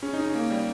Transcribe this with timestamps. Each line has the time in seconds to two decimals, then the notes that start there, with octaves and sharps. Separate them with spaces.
0.03 C#3 C#4
0.13 D#4
0.19 C#3
0.26 C#4
0.35 A#3
0.51 G3